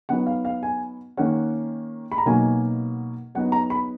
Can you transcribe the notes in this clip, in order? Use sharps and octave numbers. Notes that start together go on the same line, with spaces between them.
F#3 B3 D#4 F#5
F5
F5
G#5
D#3 A#3 C#4 F#5
B5
A#5
B2 F#3 A#3 D#4 G#5
F#3 B3 D#4 F#5
A#5
B5